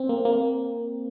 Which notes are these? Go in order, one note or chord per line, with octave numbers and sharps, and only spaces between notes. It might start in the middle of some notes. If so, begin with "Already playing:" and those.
Already playing: C4
A#3
A#3